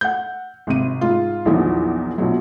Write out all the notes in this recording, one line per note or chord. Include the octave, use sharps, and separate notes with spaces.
F#5 G6
G#1 C3 D#7
G#2 F4
A#1 E2 D#3 F3 F#3
A#1 B2 F#3